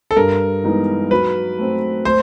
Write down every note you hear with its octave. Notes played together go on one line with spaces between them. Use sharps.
A4
G2 A#4
E3 G#3 B3 D#4
F#3 B4
A3 C4
A3 C5